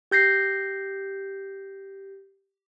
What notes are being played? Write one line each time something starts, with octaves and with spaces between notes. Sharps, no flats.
G4 G6 A#6 C7